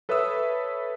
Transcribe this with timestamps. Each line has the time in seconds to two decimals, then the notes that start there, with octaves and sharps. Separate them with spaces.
0.09 A4 B4 C#5 E5 D#6 E6